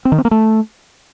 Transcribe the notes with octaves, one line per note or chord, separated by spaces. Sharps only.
C4
D#3
C4
A#3
A3